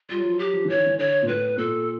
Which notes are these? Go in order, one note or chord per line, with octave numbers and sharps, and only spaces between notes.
G3 F4
F#3
F3
F#3
G4
F3
E3 C#5
D#3
E3
D3 C#5
A#2
A2 B4
A#2 A4